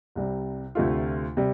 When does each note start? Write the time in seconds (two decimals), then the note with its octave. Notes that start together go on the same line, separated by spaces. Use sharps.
0.16 C2 C3 G3
0.75 D2 C3 A3 F4
1.37 C3 G3